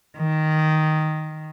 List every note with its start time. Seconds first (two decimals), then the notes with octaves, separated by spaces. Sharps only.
0.18 D#3